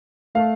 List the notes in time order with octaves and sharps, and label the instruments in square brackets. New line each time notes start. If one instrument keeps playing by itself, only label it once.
[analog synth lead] A3 [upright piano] F5